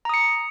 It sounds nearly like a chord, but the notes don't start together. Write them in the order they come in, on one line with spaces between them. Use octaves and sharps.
A#5 D#6 C#7